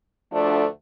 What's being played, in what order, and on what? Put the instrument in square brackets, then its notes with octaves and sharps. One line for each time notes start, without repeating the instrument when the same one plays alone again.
[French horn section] D2 D3 F3 A3 D4